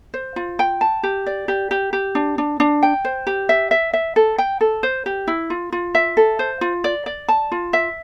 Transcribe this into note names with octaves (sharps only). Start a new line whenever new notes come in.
C5
F4
G5
A5
G4
D5
G4
G4
G4
D4
D4
D4
G5
C5
G4
E5
E5
E5
A4
G5
A4
C5
G4
E4
F4
F4
E5
A4
C5
F4
D5
D5
A5
F4
E5